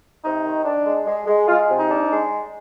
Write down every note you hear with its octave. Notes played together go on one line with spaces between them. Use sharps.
C3 D#4
D#3
D4
G#3
G#3
G#3
G#3 F4
C3
D#4
D4
G#3